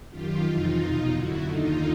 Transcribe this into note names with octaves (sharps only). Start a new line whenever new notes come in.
F#2 D#3 F4 G4
F2 C3 E3 D#4 F4
E2 B2 D#4 F4
F#2 D3 E4 F#4
D#2 D3 D#4 F4